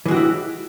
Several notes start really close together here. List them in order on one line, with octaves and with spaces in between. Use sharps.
E3 G#3 F#4 G4 E4